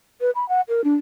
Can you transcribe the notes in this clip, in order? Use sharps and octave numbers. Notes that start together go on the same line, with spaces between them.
B4
B5
F#5
A#4
D4